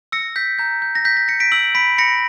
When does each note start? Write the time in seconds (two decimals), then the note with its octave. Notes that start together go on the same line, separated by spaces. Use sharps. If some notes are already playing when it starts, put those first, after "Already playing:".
0.12 E6 A#6 C#7
0.36 G6 B6
0.59 A#5 G6
0.82 G6
0.95 A#6
1.05 G6 B6
1.17 A#6
1.28 G6 A#6 C#7
1.40 B6 D7
1.52 E6 D7 F#7
1.75 B5 B6 D7
1.98 B5 A#6 C#7